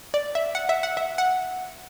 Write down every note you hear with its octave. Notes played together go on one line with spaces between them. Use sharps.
D5
E5
F#5
E5
F#5
E5
F#5